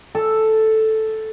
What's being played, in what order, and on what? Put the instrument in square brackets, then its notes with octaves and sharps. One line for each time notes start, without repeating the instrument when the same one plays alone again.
[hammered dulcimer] A4